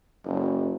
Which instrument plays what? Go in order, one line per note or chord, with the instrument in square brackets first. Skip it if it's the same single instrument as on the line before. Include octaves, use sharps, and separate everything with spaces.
[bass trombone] F#1